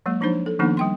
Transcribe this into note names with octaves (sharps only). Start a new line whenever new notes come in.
F#3 G#3 A#3
F3 D4 D#4 C5 C#5
A4
D#3 F3 A#3 B3 D4 D#4
G3 G5 C6